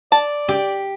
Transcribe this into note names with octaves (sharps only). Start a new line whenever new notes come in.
D5 A5
G4